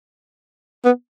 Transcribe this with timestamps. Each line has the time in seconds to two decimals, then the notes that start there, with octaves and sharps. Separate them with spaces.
0.85 B3